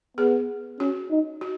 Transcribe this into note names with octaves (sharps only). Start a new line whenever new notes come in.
B3 G#4
C#4 F#4
D#4
F#4